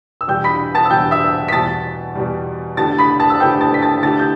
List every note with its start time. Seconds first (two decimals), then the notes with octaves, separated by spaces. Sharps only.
0.21 E6
0.28 E2 B2 G3 G5 G6
0.44 B5 B6
0.75 A5 A6
0.85 E6
0.90 E2 B2 G3 G5 G6
1.11 E5 E6
1.48 B6
1.52 E2 B2 G3 A5 A6
2.15 E2 B2 G3
2.77 D3 A3 E4 G4 A5 A6
2.98 B5 B6
3.20 A5 A6
3.30 E6
3.40 D3 A3 E4 G4 G5 G6
3.61 A5 A6
3.74 B6
3.82 A5 A6
4.03 D3 A3 E4 G4 A5 A6
4.19 G6